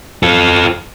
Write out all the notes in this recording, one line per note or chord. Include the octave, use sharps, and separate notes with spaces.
F4 A4